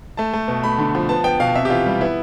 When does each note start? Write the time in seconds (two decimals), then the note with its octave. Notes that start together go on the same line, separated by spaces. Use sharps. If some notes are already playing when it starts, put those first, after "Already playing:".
0.17 A3 A5
0.33 A3
0.48 B2
0.64 A3 B5
0.79 D3
0.95 F3
1.09 B3 A5
1.24 B3 G5
1.40 B2 F5
1.55 C3 E5
1.65 G4
1.70 E3 F4
1.86 G3
2.01 B3 E4